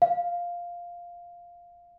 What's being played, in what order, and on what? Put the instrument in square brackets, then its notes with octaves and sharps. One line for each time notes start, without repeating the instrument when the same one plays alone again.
[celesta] F5